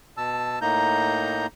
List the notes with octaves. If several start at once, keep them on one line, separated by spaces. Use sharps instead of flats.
B2 A5 E6
A2 A#3 D#4 A#5 G6